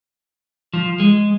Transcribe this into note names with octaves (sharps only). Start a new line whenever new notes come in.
F3
G#3